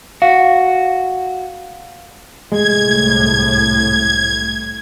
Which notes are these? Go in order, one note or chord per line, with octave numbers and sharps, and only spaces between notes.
F#4 F5
C2 A2 G#3 G#6